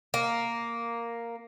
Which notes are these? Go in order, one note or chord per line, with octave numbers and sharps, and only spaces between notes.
A#3